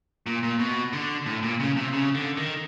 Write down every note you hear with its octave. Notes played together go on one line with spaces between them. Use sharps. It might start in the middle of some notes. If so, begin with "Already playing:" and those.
A#2
A#2
B2
D3
A2
A#2
C#3
C3
C#3
D3
D#3